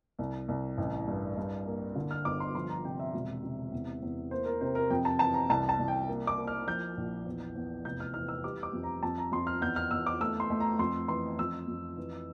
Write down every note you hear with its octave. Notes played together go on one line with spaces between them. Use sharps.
C2
C2
A1
G2
G2
A#3
D3
F6
G1 D6
C6
F3 C6
A#5
C3 G5
E5
E1
C3
E2
E2
A#3 C5
A#4
C3 C5
A#4
F2 G5
A5
E3 A5
A#5
C2 A5
A5
C2
G5
A#3
D6
A#3
F6
F3 G6
A#1
E2
E2
F1 G6
F6
E3 F6
E6
G3 D6
D6
F2
A#5
F2 A5
A#5
F2 C6
F6
E2 G6
F6
E2 E6
D6
A3 E6
C6
A3
A#5
F2 C6
E3 C6
F2 E6
F2
E3